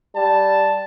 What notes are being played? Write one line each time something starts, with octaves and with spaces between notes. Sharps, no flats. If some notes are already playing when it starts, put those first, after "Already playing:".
G3 A5